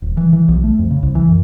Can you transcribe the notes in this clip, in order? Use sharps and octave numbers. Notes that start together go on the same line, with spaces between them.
D#1
E3
E3
B1
A3
F2
C#3
C2
E3
F#2